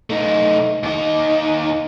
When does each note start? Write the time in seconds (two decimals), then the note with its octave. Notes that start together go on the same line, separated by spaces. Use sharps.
0.10 A3 D#4
0.83 D#2 D#4